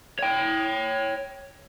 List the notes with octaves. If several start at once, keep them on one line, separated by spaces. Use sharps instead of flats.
C#5 G5